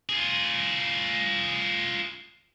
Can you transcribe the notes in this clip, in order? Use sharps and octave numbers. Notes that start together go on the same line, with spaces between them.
F4 G#4